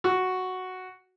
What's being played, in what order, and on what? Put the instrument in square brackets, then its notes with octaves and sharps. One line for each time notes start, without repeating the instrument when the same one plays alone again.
[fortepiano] F#4